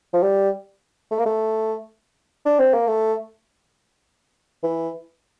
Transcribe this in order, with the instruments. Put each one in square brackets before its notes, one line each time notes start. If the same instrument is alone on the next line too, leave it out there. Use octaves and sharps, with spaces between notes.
[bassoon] F3
G3
A3
A#3
A3
D4
C4
A#3
A3
E3